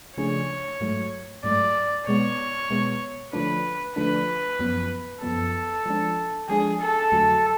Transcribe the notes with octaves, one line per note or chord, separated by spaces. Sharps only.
C#3 F3 A3 D4 G#4 C#5
G#2 F#3 A3
G#2 F#3 A3 D5
B2 G#3 B3 C#5
B2 G#3 B3
D3 F3 A3 D4 B4
D3 F3 A3 D4 B4
F#2 F3 B3
F#2 F3 B3 A4
F3 G#3 D4
F3 G#3 D4 G#4
A4
F2 D3 F#3 A3